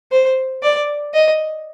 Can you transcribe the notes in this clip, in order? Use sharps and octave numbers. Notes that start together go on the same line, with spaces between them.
C5
D5
D#5